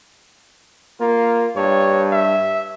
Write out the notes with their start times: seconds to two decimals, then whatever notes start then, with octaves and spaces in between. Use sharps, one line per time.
1.01 A#3 F4
1.56 G2 C#5
2.13 E5